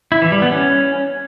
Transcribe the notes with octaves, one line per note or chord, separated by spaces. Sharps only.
E4
E3
G3
B3
C#4